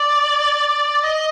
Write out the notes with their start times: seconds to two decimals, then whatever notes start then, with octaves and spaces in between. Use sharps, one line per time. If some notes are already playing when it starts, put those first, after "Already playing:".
Already playing: D5
1.04 D#5